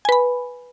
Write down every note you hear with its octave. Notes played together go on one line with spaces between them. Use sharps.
B4 G#5 B5